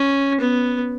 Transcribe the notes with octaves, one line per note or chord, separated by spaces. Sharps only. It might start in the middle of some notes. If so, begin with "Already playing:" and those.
Already playing: C#4
B3